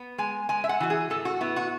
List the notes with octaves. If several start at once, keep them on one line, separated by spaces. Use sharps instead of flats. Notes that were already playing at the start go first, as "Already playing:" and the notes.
Already playing: B3
G#3 G#5
G#3 G#5
E5
F#5
E3 F#4
G#4
A2 A4
F#4
B3 E4
F#4